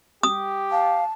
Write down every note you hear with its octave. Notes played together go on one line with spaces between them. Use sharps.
G4 D#6
F5 A5